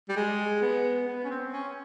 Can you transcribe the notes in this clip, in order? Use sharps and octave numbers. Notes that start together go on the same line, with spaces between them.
G3
G#3
B3
B3
C#4
C4
C#4